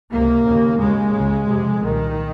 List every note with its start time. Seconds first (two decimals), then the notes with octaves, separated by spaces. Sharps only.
0.11 C#2 C3 A#3
0.46 D#2 C#3
0.79 D#2 C#3 G#3
1.14 C#2 C#3
1.47 F2 C3
1.81 C2 A#2 D#3